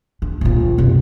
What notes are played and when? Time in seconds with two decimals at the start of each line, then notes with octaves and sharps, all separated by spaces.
0.22 D4
0.41 A#1 F4
0.78 F#2 C3